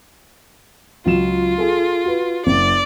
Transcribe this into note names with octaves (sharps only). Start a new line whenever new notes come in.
C#2 F#3 F4 E7
G#4 A4
F#4 B4
F#1 D5